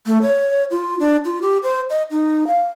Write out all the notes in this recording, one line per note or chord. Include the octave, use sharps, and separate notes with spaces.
A3
C#5
F4
D4
F4
G4
C5
D#5
D#4
F5